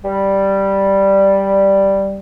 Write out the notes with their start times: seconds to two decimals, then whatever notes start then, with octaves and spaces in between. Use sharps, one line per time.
0.03 G3